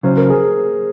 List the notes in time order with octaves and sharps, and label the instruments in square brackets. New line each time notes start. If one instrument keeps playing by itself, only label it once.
[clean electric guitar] C#3 F#3 C#4 [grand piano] C5
[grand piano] A#4
G#4